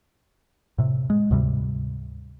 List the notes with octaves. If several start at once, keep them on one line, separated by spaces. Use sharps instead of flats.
A2 C3
G#3
D2 G#2 C3 G3